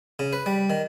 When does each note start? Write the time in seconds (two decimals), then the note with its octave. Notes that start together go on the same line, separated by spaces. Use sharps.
0.19 C#3
0.33 B4
0.46 G3
0.70 D#3